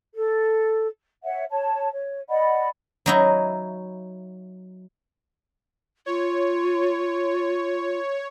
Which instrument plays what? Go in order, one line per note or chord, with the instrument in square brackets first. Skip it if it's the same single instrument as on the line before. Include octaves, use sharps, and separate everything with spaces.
[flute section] A4
C#5 E5 F#5
C#5 A5
C#5
D5 D#5 F#5 B5
[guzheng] F#3 D#4 E4
[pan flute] F4 [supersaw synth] C#5